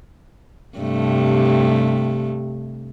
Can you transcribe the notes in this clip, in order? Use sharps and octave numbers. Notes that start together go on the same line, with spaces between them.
G2 C3 A3